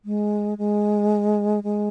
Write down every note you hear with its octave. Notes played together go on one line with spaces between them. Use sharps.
G#3
G#3
G#3